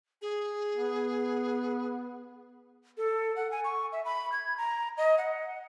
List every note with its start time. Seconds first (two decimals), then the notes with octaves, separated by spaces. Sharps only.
0.22 G#4
0.75 B3
2.98 A4
3.36 F#5
3.51 G#5
3.64 C#6
3.92 E5
4.05 B5
4.32 G#6
4.57 A#5
4.97 D#5
5.18 F#5